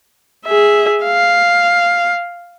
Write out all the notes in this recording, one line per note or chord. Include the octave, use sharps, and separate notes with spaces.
G#4 E5
F5